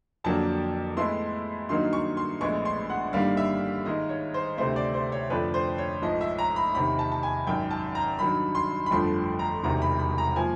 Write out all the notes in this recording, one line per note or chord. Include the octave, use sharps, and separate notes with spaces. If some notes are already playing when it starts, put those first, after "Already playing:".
F2 D3 F#3 A#3 D4 A5
A2 E3 G#3 B3 E4 C6
G2 D#3 F#3 A#3 D#4 C6
C#6
C6
A#1 A2 E3 G#3 B3 C#6
C6
F#5
G1 G2 D#3 G3 A#3 F5
E5
G#2 D#3 G#3 D#5
C#5
C5
D2 C3 E3 A3 C5
D5
C5
C#5
F2 D3 F3 A3 D4 B4
C5
C#5
A1 G#2 F3 D#5
E5
A#5
B5
E2 C3 D#3 B5
A5
A5
G#5
G#1 F#2 D#3 G5
A5
A#5
G2 D#3 F#3 B5
C6
B5
G1 F2 D3 F3 A3 C6
A#5
E1 E2 C3 D#3 A#5
B5
B5
A#5
F3 A#3 G#5